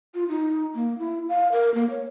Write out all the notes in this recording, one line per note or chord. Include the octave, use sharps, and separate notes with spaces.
F4
D#4
A#3
E4
F5
A#4
A#3
C#5